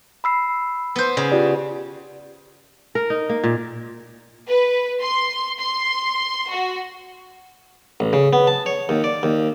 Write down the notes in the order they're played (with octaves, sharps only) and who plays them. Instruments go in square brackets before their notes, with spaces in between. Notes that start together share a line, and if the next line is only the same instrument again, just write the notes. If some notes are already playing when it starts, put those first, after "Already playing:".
[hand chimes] B5 E6 C7
[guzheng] B3 C5
C#3
[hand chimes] F4 G4 D5
[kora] A#4
D#4
A#3
A#2
[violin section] B4
C6
C6
F#4
[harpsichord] A1
C#3
B3
A5
C#5
D#2
D5
D#2